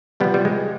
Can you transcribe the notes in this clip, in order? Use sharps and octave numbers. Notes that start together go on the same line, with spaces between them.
C3 F3 G3 B3
G3
G#3